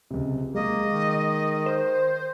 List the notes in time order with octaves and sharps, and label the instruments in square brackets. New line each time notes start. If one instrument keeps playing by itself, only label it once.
[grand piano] C#2 C3
[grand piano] G#3 [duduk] A#3 [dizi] D#5
[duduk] D#3
[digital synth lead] C5